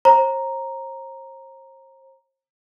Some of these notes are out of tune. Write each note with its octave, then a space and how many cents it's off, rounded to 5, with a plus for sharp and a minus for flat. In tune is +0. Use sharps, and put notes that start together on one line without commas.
C5 +40 A#5 +0